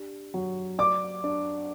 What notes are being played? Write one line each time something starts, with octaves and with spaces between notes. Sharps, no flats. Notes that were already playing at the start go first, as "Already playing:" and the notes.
Already playing: D4 G4
F#3
D5 D6
D4